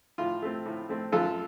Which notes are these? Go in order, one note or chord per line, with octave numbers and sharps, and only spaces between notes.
A2 F4
A3 C4
A2
A3 C4
F#2 F4 A4